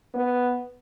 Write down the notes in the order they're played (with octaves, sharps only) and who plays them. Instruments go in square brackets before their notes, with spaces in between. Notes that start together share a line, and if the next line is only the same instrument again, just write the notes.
[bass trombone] B3